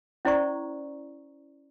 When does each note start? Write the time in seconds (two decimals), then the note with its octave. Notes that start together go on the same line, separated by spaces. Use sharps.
0.25 C#4 E4 C5 D5 A#5 C#6